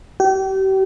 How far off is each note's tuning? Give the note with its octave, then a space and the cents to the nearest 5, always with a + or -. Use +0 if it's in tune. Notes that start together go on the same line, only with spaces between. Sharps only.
G4 -35